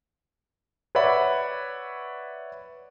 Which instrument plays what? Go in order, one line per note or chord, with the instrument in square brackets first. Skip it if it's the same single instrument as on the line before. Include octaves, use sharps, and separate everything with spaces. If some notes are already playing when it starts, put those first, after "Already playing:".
[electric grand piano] B4 C#5 D5 E5 F#5 B5